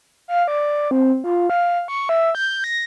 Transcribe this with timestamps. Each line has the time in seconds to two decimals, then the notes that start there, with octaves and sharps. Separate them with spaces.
0.28 F5
0.48 D5
0.91 C4
1.24 F4
1.50 F5
1.88 C#6
2.09 E5
2.35 G6
2.64 A#6